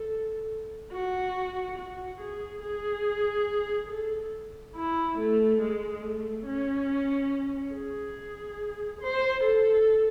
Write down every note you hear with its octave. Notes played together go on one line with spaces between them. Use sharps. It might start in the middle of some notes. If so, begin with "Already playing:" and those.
Already playing: A4
F#4
F#4
G#4
G#4
A4
E4
A3
G#3
A3
C#4
G#4
C5
A4